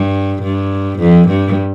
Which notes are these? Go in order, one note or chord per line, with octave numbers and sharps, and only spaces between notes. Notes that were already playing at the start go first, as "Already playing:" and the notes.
Already playing: G2
G2
F2
G2